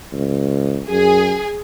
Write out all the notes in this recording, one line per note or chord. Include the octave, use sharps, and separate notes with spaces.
C#2
F#2 G#4